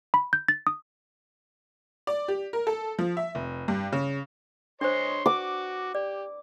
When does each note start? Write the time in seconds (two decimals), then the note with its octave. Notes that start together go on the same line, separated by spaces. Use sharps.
0.14 B5
0.33 G6
0.48 A6
0.67 D#6
2.07 D5
2.28 G4
2.53 A#4
2.67 A4
2.99 F3
3.17 E5
3.35 F1
3.68 G2
3.92 C#3
4.81 D4 C5 C#5 D#5 C6
5.26 F#4 D6
5.95 G4 D5